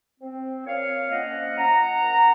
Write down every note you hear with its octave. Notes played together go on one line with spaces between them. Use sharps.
C4
A#2 C#5 F5
F3 A#3 C#4 D#5 F#5
F3 F#5 A#5
A#3 C#4